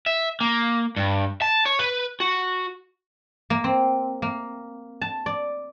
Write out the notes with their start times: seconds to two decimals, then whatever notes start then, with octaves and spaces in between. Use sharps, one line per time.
0.06 E5
0.41 A#3
0.96 G2
1.42 A5
1.66 C#5
1.79 B4
2.20 F#4
3.50 A#3
3.64 C4
4.22 A#3
5.01 A5
5.26 D5